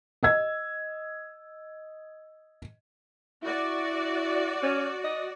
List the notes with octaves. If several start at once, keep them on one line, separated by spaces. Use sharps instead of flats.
D#5 E6 G#6
E4 F#4 D5
C#4
D#5